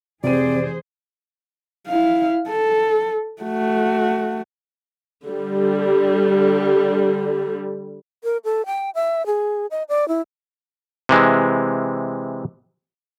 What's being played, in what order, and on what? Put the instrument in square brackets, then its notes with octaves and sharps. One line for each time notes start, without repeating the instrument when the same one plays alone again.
[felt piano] F1 G4 D#7 [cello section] E3 G#4 C5 [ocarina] C4 [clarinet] D5
[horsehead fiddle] E4 F5
A4
A3 F#4
[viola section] D3 G3
[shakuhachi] A#4
A4
G5
E5
G#4
D#5
D5
E4
[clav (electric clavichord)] C3 E3 G#3